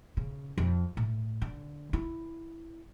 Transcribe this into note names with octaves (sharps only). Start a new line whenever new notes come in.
C#3
F2
A2
D3
E4